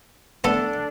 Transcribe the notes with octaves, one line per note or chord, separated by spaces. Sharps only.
A3 B3 D4 A4